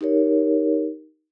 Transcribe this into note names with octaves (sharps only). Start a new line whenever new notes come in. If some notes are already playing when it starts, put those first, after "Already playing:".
D#4 G4 A#4 C#5